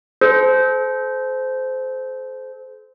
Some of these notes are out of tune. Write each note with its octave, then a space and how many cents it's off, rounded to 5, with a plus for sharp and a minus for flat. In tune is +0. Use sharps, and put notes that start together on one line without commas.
A4 -40 C5 -15